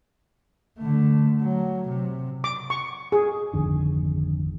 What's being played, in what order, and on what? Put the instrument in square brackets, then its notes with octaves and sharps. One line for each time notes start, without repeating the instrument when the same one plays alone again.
[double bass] D3 A3
F#3
C3
[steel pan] D6
C#6
G#4
[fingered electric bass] G#1 F2 D3 D#3